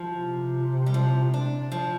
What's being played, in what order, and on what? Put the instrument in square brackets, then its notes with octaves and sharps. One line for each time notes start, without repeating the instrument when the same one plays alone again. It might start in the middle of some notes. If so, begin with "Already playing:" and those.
Already playing: [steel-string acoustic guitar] F3
[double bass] C3
[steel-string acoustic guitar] G3
F3
D4
F3